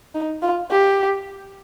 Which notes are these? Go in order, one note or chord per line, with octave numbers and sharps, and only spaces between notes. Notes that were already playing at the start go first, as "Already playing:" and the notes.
D#4
F4
G4